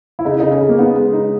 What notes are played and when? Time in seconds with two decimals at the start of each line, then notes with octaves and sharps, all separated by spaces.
0.19 E4
0.25 C#3 D#4
0.40 C#3 D#4
0.51 C#4
0.61 C#3
0.69 A#3
0.78 B3 D#4
0.96 G#3
1.13 D#4